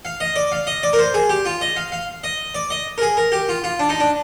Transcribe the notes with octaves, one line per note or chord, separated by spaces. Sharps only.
F5
D#5
D5
F5
D#5
D5
A#4
C5
G#4
G4
F4
D#5
F5
F5
D#5
D5
D#5
A#4
G#4
A#4
G4
F4
F4
D4
D#4
D4